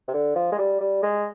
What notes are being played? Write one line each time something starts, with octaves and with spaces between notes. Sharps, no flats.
C3
D3
F3
G#3
G3
G3
G#3